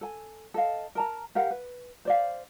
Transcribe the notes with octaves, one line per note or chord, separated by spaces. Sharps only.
A4 G#5
A4 D#5 F5
A#4 A5 A#5
G4 A#4 F5 F#5
B4
C5 D5 F5